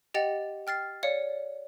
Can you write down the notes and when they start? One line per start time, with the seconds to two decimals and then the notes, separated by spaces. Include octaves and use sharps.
0.14 G4 D#5 F#5 G5 A6 F7
0.67 G5 F6 A6 C7
1.03 C#5 D5 F5 C#7